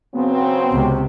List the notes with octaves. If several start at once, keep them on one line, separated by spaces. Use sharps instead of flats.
C#3 F#3 B3 C4
C#2 C3